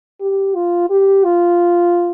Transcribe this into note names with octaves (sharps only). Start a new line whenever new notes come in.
G4
F4
G4
F4